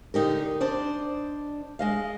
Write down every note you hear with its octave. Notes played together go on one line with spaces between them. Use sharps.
D3 D#4 G4 A#4
D4 C5 D5 D#5
G#3 D#5 F5